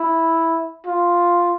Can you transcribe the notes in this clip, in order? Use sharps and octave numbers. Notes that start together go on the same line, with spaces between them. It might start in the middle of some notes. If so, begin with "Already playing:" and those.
Already playing: E4
F4